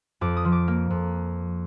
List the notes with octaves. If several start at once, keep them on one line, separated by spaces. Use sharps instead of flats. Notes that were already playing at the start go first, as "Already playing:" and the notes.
F2 D6
D#6
F3
D6
A#3
F2